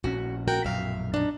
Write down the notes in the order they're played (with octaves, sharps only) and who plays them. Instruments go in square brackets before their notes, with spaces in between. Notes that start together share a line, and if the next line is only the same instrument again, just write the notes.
[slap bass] A#1 C#4 [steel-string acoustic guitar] F#4
[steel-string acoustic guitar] F#4 A#4 G5
[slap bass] A#1 F#2 B2 [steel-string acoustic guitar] E5 F5
[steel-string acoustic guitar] D4 D#4